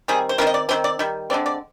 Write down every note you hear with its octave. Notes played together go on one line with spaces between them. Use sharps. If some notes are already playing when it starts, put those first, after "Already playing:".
D#3 G3 C4 G#4
C5
D#3 G3 C4 A#4
D#5
D5
D#3 G3 C4 C5
D5
D#3 G3
D3 G#3 C4 D5
D5